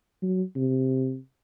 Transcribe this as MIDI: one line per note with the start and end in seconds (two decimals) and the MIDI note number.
0.22 0.43 54
0.56 1.17 48